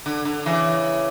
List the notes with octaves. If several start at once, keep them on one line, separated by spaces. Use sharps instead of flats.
D3
D3
C#3 E3